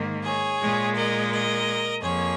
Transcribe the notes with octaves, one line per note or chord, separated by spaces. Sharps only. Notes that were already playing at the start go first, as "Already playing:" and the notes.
Already playing: G#2 D#3 A#3
G#4 C#5
A#2 G#3
A#4 D#5
A#4 D#5
F2 F3 A#3 G#4 C#5